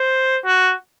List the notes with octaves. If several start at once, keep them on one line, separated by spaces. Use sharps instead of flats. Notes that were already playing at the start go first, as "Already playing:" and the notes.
Already playing: C5
F#4